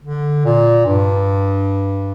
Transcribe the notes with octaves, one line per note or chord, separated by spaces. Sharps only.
D3
A#2
G2